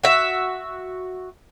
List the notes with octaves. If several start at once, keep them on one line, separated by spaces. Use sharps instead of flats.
F#4 E5